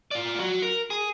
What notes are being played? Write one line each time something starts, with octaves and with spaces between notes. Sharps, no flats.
F4 D5
F#3 F#4
A#4
G#4